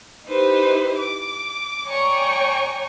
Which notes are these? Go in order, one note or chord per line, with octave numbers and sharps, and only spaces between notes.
D#4 E4 G4 B4 C5
D6
C#5 D5 G5 G#5 A#5 C#6